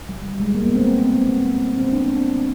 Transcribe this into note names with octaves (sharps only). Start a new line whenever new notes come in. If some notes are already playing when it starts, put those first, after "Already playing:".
G3
G3
G#3
A#3
B3
C4
B3
C4
D4